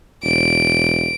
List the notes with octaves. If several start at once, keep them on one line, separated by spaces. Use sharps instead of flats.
E1 D7